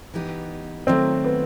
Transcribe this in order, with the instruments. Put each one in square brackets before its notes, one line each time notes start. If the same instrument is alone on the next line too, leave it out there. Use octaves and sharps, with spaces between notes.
[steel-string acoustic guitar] E3 B3 D#4 G4
[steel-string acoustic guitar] D#3 F#3 A3 [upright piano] C4
[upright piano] B3